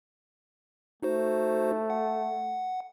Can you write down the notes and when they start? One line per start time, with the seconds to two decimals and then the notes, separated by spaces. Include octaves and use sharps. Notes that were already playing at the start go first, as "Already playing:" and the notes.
1.03 A3 D#4 F#4 C5
1.90 F#5